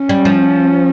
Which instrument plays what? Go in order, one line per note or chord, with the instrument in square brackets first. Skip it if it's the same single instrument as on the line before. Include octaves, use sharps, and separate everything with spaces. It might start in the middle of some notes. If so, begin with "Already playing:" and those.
Already playing: [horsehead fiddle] C#4
[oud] G3
F3